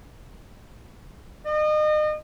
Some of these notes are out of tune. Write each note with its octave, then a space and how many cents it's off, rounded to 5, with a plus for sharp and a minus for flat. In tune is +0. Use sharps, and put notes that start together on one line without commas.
D#5 -35